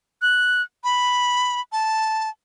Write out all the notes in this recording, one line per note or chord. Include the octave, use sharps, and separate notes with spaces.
F#6
B5
A5